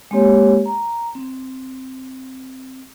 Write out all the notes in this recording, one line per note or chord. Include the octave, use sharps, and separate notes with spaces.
G#3 A#3 C4 G4 C#5
A#5
C4